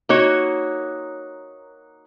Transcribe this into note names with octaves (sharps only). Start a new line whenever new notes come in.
A#3 D#4 F#4 C#5